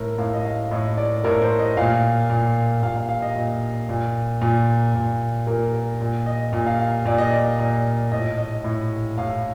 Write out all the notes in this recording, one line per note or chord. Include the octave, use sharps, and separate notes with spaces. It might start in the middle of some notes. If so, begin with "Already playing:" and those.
Already playing: A2 A#4
A2 F5
D#5
F5
A2 D#5
D5
A2 A#4
C5
D#5
A#2 F5
A#2
A#2 F5
F5
F5
D#5
A#2
A#2
A#2
A#2
A#2 A#4
A#4
A#2
D#5
A#2
F5
F5
A#2 D5
D#5
D5
A#2
A2 D#5
D#5
A2
A2 F5